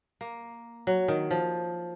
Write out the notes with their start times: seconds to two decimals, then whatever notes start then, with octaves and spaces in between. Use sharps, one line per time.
0.21 A#3
0.87 F#3
1.08 D#3
1.31 F3